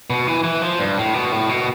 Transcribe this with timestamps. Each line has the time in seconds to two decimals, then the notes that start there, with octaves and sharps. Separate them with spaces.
0.10 B2
0.27 E3
0.44 E3
0.62 F3
0.79 G2
0.97 A2
1.14 B2
1.32 A2
1.49 B2